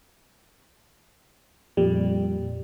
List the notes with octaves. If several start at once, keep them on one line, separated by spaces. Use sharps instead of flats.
F2 A#2 G3